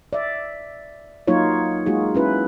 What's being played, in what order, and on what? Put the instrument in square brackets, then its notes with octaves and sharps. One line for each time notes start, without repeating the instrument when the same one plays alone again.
[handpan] D5 E5
F#3 A#3 D#4 F4 C#5
G#3 A#3 D#4 F4 F#4 G#4
C#4 E4 B4